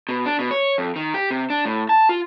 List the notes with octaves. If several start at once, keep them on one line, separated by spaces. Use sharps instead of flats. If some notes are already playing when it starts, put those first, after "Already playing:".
B2
D4
B2
C#5
F2
D#3
G4
C3
D4
A2
A5
F4